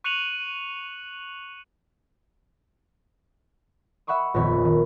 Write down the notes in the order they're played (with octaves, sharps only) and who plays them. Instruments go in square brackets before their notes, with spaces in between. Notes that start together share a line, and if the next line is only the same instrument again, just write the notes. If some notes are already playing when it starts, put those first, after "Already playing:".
[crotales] C#6 F#6 C#7 D#7 F7 F#7
[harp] E5 F#5 B5 C#6 D#6
D#1 A#1 F2 B3 C#5 B6
D#3